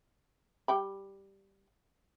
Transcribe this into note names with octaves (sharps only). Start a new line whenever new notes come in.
G3 G5 B5